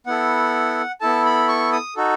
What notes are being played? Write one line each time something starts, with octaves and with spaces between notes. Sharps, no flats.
B3 E4 A4 F#5
B3 E4 A4 A5
B5
C#6
D#6
D#4 F#4 A4